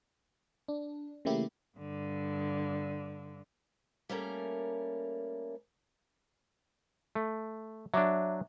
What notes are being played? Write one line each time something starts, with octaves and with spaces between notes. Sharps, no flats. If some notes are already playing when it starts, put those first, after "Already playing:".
D4
C#3 E3 A3 A#3 E4 G4
G2 D3
G3 A3 A#3 C#4 A#4
A3
F#3 D4 E5 D6